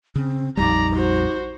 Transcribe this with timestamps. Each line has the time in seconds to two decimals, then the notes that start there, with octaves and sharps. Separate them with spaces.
0.15 C#3 C4
0.57 A#1 F2 G3 D#4 D5 A#5
0.95 F#4 C5